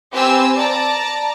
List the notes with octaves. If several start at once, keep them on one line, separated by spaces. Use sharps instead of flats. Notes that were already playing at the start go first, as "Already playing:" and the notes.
C4 G4 B4 G#5 E6
D5 A5 A#5